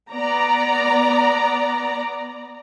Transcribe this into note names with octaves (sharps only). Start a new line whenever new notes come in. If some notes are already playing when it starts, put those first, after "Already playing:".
B3 D5 A#5